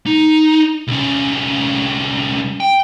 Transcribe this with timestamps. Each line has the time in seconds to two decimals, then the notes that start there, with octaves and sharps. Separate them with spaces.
0.06 D#4
0.87 C2 C#4
2.60 G5